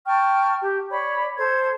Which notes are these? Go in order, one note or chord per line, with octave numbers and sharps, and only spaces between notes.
G5 A5 C#6 F6
G4
C#5 D5 B5
A4 C5 G#6